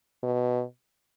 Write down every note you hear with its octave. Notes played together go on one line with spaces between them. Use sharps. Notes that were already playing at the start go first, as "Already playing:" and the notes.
B2